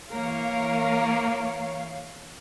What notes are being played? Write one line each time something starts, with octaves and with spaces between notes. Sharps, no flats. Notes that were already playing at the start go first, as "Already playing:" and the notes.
E3 A#3 A#4 C#5 F5